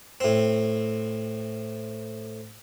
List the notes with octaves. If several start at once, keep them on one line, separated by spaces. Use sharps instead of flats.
A2 C4